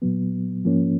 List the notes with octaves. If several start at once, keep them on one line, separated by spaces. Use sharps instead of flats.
A#2 F#3 B3
G#2 F3 A#3 C#4